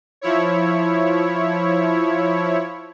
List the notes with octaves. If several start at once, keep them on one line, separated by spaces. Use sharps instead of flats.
F3 E4 C#5